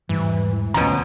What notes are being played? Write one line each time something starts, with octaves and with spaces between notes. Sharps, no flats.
E1 G#2 E3 G3
D2 B2 F3 A3 C#4 A#5